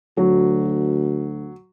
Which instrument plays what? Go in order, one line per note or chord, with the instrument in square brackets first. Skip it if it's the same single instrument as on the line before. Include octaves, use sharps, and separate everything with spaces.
[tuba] D2 [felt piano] F#3